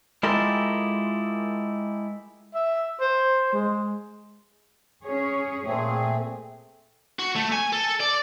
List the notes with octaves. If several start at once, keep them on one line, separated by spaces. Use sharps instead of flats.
G#3 E4 F4 G4 A4 A#4
E5
C5
G#3
C#4 G#4 C#5
A#2 A3 C4 G#4
F#4
A3
G#5
A4
D5